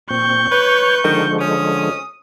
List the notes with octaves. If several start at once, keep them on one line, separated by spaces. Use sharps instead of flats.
A#2 C4 C#6 G6
B4 C#5
D3 D#3 F3 G#3
C#4 D#6